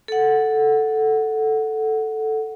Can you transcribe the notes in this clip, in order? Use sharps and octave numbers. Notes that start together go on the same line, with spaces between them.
A4 F#5